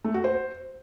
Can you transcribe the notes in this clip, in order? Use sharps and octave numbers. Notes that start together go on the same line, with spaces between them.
A3
F#4
C5